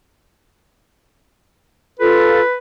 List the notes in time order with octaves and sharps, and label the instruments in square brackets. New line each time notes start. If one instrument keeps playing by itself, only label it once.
[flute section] F4 A4 [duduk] B4